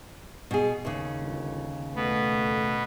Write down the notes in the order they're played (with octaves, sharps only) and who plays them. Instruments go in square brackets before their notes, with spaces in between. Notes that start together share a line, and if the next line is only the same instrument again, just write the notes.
[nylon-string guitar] B2 G#4
D#2 C#3
[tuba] G1
[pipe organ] B2 B3 [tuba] A3